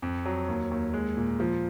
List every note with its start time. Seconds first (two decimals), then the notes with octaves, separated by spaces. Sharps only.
0.02 F2
0.26 F#3
0.48 D#2
0.71 D#2
0.94 G#3
1.17 A#2
1.40 F3